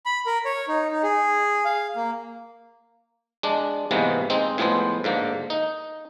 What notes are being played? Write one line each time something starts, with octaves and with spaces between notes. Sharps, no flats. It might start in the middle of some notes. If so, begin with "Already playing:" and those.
B5
A#4
C#5
D#4
D#4
G#4
F5
A#3
G#3 D4
G#2 C3 E3 G#3 A#3 B3
G#3 C4 D#4
A2 F3 G#3 B3 C5
G#2 D3 A#3
D#4